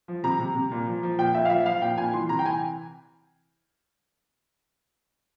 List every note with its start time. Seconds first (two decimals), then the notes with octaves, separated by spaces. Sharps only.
0.08 F3
0.24 C3 A#5
0.39 C3
0.55 C3
0.71 A#2
0.87 F3
1.03 F3
1.18 A#2 G5
1.34 A#2 E5
1.45 F5
1.50 F3 E5
1.66 F3 F5
1.82 A#2 G5
1.97 A#2 G#5
2.13 E3 C6
2.29 C3 A#5
2.39 G5
2.45 E3 G#5